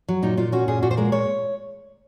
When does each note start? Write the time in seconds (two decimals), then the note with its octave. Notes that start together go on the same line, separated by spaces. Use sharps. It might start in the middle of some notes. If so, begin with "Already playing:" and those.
0.08 F#3
0.23 A#2 D#4
0.37 A#2 F4
0.52 C#4 F#4
0.68 A#2 G#4
0.82 A#2 F#4
0.91 C5
0.97 G#3 A#4
1.12 A#2 C#5